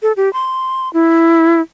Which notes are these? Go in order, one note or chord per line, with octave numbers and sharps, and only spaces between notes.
A4
G4
C6
E4